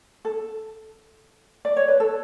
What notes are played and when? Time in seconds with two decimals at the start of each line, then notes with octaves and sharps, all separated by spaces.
0.25 A4
1.65 D5
1.77 C#5
1.88 B4
2.00 A4